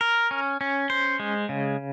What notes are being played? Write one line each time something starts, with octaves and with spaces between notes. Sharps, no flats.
A#4
C#4
C#4
C5
G#3
C#3